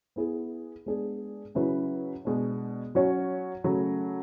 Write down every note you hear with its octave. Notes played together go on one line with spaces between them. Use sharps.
B3 E4 G#4
G#3 B3 D4 G#4
C#3 F#3 C#4 E4 B4
B2 G#3 D4
F#3 C#4 F#4 C#5
C#3 F#3 A3